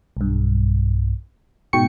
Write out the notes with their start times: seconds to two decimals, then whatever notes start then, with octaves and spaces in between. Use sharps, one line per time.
0.17 B1 G2
1.73 G#2 B2 G5 C#6 C#7